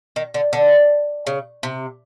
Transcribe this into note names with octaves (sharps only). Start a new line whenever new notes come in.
D#3
D3
D3
C#3
C3